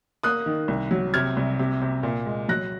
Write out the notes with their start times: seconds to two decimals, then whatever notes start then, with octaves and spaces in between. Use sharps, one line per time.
0.23 A#3 D#6 F#6
0.46 D#3
0.68 C2
0.91 F#3
1.14 C3 F6 G#6
1.37 C2
1.59 C3
1.82 C3
2.03 A#2
2.26 G#3
2.49 F#3 F#6 A#6